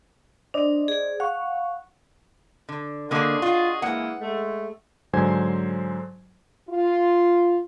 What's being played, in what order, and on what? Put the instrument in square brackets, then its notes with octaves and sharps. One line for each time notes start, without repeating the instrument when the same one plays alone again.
[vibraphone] D4 [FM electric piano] C5 D5 D#5
[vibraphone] G#4
[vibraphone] F5 [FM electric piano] F#5 C#6
[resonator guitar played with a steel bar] D3
[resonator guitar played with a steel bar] D3 A#3 [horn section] F#4 G#4 D#5
[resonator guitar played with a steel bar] F4
[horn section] E3 G#3 A#3 [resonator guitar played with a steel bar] F#5
[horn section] G#3 A3
[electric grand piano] G#2 D3 F#3 C5 G#5 G#6
[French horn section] F4